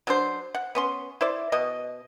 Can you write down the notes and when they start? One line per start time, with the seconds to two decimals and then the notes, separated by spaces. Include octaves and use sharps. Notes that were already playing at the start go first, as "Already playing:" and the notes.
0.07 F#3 D4 C5
0.55 F#5
0.75 B3 C#4 C6
1.21 E4 C5 D5
1.52 B2 D#5